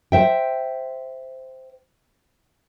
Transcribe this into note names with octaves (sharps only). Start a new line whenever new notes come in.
C5 E5 G5